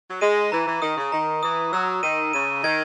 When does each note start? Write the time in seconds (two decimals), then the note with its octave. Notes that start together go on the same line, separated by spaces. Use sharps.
0.10 F#3
0.21 G#3 D#7
0.51 E3 A#5
0.67 E3
0.82 D#3 D#6
0.97 C#3
1.12 D#3 A#5
1.43 E3 D#6
1.72 F#3 E6
2.03 D#3 D#7
2.33 C#3 D#7
2.63 D#3 G#6